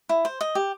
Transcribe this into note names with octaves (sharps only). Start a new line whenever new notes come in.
E4
C5
D#5
G4